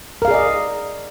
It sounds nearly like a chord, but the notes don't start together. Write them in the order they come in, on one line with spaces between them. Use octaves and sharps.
A#4 F5 G#4 D5 D#5